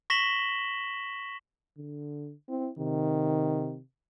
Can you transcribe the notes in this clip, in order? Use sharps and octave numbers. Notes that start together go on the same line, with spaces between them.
C#6 A#6 B6 E7 F#7 G7
D3
C4 E4
C3 D#3